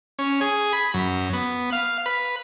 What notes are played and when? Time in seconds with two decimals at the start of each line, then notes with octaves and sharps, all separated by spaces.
0.19 C#4
0.41 G#4
0.73 B5
0.94 F#2
1.33 B3
1.73 F5
2.06 B4